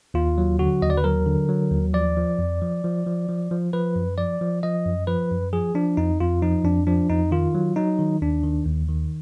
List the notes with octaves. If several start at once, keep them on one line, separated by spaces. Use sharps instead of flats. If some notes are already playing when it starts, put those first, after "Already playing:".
D#2 F4
F#3
D3 F#4
D#2 D#5
D5
B4
F#3 A#4
D3
F#3
D#2
F3 D5
F3
F2
F3
F3
F3
F3
F3
F3 B4
F#2
F3 D5
F3
F3 D#5
F#2
F3 B4
F#2
F3 G#4
F3 D4
F2 D#4
F2 F4
F3 D#4
F2 D4
F3 D4
F2 D#4
D#3 F4
F#3
F#3 D#4
D#3
D#2 D4
D#3
D#2
D#3